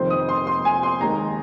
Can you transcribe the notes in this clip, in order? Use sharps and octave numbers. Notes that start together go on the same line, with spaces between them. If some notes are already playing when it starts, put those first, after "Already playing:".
Already playing: F1 F2 D#3 C4 C5
D#6
C6
C6
G#5
C6
D#2 D#3 G#3 A#5